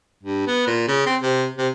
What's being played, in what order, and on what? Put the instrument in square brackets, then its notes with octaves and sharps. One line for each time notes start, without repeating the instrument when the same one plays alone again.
[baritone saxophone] G2
B3
A#2
C#3
C4
C3
C3